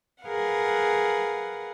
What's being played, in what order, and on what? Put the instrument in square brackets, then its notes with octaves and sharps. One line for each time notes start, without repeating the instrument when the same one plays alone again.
[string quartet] G#4 A#4 B4 F5 F#5